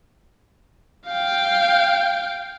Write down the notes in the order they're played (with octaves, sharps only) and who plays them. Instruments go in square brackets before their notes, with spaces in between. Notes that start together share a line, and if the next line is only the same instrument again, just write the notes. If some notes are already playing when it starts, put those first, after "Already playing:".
[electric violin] F5 G5